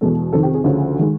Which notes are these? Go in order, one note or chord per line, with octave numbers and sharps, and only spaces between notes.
E2 B2 G#3 A4
F2 C3 D#3 A4
G4
G#4
D2 C#3 F3
D#3 G#3